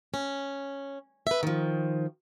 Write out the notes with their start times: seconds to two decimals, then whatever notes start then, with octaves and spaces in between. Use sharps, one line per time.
0.14 C#4
1.27 B4 E5
1.43 D#3 F3